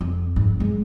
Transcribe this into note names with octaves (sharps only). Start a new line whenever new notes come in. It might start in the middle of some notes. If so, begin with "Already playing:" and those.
F2
G#2
G#3